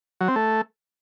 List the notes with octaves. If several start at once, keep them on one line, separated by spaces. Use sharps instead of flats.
F#3
C4
A3